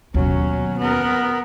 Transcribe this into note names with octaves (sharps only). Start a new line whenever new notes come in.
D#2 B2 F#3 C#4
B3 A#4